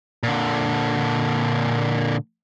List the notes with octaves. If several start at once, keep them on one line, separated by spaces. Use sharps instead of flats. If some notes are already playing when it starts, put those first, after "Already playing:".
A#2 D3